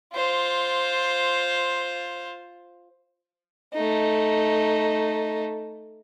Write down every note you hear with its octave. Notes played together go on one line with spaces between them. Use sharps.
F4 C5
A3 D#4